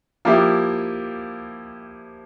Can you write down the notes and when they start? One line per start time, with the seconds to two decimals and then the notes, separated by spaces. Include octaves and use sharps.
0.25 F3 A#3 E4 G4